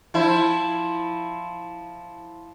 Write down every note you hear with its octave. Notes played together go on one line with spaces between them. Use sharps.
F3 E4